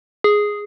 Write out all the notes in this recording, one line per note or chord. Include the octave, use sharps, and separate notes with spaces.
G#4